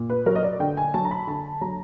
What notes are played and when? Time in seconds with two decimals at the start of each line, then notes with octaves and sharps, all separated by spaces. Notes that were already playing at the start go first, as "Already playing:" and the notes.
Already playing: A#2
0.10 B4
0.26 F#3 A#4
0.35 D#5
0.43 D5
0.60 D3 G5
0.77 G#5
0.94 F#3 A5
1.05 A#5
1.11 B5
1.27 D3 A5
1.61 F#3 A#5